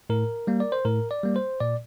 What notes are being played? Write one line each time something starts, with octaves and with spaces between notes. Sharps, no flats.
A2 A#4
G3 A#3
D5
C5
A2 A#4
D5
G3 A#3
C5
A#2 D5